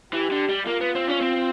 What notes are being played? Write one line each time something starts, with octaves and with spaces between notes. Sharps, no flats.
E3 G4
D3
G3
A#3 F4
B3
C4
C#4
C4